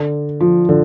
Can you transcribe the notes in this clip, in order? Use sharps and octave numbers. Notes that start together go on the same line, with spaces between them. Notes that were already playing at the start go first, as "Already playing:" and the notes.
Already playing: D3
F3
D3